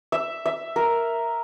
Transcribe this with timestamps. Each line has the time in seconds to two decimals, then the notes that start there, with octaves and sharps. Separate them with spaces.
0.12 E5
0.46 E5
0.76 A#4